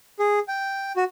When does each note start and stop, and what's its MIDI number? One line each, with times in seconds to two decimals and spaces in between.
0.19 0.39 68
0.48 0.92 79
0.96 1.04 66